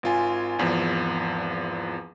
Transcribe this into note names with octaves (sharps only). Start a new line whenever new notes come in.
G#1 F4 G#5
G#1 E2 F3